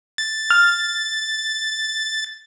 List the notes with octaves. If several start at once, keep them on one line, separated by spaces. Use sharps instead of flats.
A6
F6